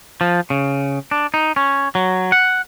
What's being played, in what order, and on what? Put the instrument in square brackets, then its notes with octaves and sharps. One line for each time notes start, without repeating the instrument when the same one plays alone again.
[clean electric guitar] F3
C#3
D4
D#4
C#4
F#3
F#5